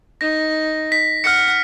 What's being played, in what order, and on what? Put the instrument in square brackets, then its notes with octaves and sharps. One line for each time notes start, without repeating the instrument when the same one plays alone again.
[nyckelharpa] D#4 [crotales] A#6
[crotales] B6
[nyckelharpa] F#5 [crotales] F6 C#7